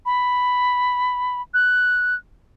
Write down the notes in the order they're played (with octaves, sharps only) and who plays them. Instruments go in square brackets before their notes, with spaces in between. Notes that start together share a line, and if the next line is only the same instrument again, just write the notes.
[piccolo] B5
F#6